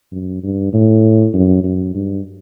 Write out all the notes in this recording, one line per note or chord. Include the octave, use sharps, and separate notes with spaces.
F#2
G2
A2
F#2
F#2
G2